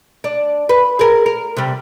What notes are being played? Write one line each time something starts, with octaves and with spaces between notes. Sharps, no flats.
D4
B4
G#4 A#4
A#4
C3 G3